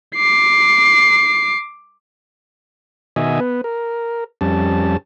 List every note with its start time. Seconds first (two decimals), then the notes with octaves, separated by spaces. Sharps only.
0.15 D6 C7
3.16 B2 D#3 F#4 D#5 E5 G#5
3.40 B3 B4
3.64 A#4
4.41 F2 G3 C#4 A5